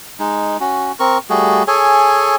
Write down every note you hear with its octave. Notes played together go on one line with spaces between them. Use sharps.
G#3 D#4
C#4 F#4
C4 A#4 C#6
G3 A3 F#4 G#4
G#4 A4 C#5 G#5